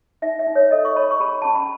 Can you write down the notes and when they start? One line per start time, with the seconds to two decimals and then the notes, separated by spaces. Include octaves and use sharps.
0.22 D#4 E5
0.39 E5
0.47 D#4
0.55 C#5
0.71 A4 D#5
0.85 C#6
0.96 C#5 B5
1.11 C#6
1.20 G#4 B5
1.42 C#4 A5
1.55 B5